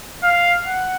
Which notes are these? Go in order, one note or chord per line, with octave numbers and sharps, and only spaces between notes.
F5
F#5